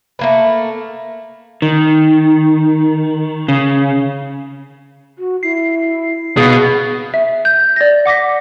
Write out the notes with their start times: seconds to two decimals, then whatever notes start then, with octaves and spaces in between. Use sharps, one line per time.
0.19 A3 A#3 B4
1.62 D#3
3.48 C#3
5.18 F#4
5.43 E4 C7
6.37 B2 G#4 F5
7.14 E5
7.45 G6
7.76 D5 A#6
8.06 F#5 D6 A#6 B6